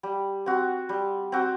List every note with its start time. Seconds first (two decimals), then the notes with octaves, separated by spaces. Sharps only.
0.03 G3
0.46 C4 F#4
0.89 G3
1.32 C4 F#4